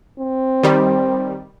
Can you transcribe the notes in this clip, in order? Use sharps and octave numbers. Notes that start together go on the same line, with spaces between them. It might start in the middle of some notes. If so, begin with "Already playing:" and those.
C4
D#3 G3